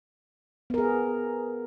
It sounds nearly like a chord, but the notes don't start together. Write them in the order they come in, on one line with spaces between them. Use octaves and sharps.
B3 A#4 G#4